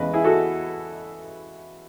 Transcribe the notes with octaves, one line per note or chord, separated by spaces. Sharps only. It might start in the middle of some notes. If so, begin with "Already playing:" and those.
Already playing: E2 C#3 G#3 B3 B4 D#5
E4 G#4
F#4 A4